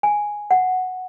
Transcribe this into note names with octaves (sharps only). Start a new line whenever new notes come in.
G#5
F#5